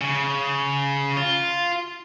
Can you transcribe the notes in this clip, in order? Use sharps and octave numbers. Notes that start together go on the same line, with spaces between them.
C#3
F4